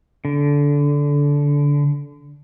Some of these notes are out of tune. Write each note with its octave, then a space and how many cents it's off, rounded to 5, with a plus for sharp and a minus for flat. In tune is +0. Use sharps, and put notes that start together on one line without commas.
D3 -20